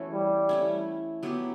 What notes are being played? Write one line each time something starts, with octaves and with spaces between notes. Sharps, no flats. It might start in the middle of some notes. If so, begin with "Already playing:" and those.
Already playing: E3 A3 C#4 F#4
G3
A3 C#4 E4
F#3 B3 E4 G4